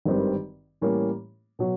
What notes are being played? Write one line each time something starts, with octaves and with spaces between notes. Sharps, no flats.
G#1 G2 D#3 G3 C4
A2 E3 G3 A#3 C#4
B2 F#3